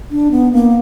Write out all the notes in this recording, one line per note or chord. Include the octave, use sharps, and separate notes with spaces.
D4
B3
A#3